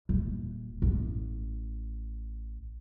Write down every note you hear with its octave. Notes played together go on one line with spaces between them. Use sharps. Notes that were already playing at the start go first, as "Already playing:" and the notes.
D#1
A1